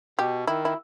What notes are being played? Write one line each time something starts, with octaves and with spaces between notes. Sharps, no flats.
B2 G4
D#3 E4
E4